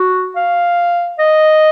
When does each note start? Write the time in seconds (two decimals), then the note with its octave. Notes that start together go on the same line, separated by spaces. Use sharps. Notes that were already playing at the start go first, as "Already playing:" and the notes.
Already playing: F#4
0.36 F5
1.19 D#5